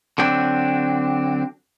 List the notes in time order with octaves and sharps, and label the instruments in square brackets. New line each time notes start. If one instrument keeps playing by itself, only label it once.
[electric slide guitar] D3 F#3 C4 D4